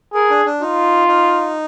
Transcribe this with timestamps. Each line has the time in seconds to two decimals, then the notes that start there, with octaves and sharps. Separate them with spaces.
0.13 G#4 A#4
0.30 D4
0.45 D4
0.61 D#4 F4
1.08 D#4